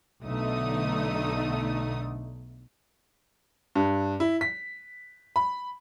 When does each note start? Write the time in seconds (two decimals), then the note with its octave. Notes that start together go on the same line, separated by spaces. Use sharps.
0.24 B1 D3 A3 D#4 D#6
3.75 G2
4.20 E4
4.41 B6
5.36 B5